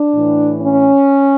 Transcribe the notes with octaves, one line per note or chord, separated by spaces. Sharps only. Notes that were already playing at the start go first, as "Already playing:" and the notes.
Already playing: D4
A2 E3
C#4